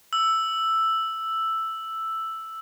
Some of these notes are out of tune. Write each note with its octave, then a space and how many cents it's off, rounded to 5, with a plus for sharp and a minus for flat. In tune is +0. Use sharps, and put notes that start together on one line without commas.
E6 +0